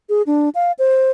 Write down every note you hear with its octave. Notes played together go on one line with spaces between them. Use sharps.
G#4
D4
F5
C5